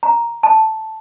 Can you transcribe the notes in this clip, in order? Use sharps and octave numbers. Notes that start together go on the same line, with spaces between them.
A#5
A5